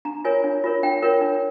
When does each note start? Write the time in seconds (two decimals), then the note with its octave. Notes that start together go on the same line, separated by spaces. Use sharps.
0.05 D4 A#5
0.24 F4 A#4 C#5 G#5
0.44 D4
0.64 F4 A#4 C#5
0.83 D4 G5
1.02 F4 A#4 C#5
1.21 D4